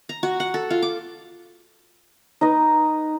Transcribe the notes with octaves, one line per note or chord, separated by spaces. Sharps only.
A#5
F#4
F#5
A4
F4
D6
D#4 B4 D#5